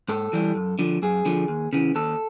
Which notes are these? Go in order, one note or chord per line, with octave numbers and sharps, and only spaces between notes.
G#2 A4
E3 G3
F#2
D3 F3
F#2 G#4
D3 F3
D#2
C#3 E3
D#2 A4